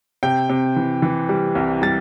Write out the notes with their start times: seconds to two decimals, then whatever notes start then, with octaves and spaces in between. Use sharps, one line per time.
0.23 C3 G5
0.49 C3
0.76 E3
1.02 E3
1.29 G3
1.55 C2
1.82 G3 A6